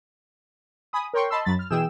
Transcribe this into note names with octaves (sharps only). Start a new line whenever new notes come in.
G#5 B5 D#6
A#4 C#5 G5 C6 C#6
D#5 A5 B5 C6 E6
F#2 F#3 B5 A6
F6
B2 E3 G#4 G5 E6 E7